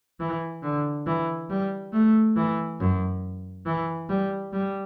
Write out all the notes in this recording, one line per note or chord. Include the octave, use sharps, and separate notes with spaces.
E3
D3
E3
G3
A3
E3
F#2
E3
G3
G3